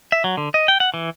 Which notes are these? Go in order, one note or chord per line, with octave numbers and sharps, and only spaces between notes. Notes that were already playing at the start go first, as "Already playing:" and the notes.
E5
F#3
D3
D#5
G5
F#5
E3